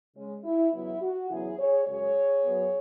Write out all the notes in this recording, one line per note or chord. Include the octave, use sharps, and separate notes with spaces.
C#3 G#3 C#4
E4
E2 C#3 F#3 B3 E4
F#4
E2 C#3 F#3 B3 E4 G#4
G#4 C#5
F#2 C#3 G#3 G#4 C#5
F#2 F#3 B3